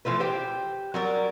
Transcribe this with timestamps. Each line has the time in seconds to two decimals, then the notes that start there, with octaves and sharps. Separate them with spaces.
0.05 E3 F3 A3 B4
0.20 G4 C5 G5
0.94 F#3 G3 A#4